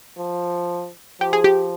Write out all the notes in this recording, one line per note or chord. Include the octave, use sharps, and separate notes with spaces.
F3
F3 G4
G#4
G4